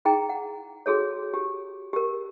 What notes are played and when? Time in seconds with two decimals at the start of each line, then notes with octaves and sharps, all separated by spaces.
0.05 D#4 E4 G#4 G5 A#5
0.29 F#5
0.86 F#4 G#4 A4 C#5
1.34 G4
1.93 G4 A#4